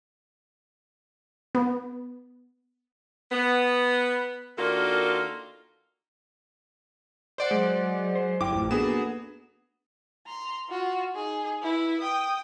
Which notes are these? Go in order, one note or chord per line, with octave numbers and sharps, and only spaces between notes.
B3
B3
D#3 A#3 D4 F4 F#4 A4
C5 D5 F#5
F#3 G#3
C5
G1 E4 G5 D6
A1 F2
A#3 B3 D4 F#4 G#4 A4 E7
A#5 C6
F4 F#4
D#4 G#4
E4 B4
G5 D#6